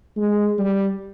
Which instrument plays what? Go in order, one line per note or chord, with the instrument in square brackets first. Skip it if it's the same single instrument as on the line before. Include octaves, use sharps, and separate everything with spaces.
[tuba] G#3
G3